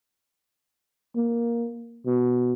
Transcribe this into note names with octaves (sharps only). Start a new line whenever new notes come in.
A#3
B2